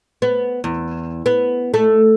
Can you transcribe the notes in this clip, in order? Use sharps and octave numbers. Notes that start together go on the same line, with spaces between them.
B3
E2
B3
A3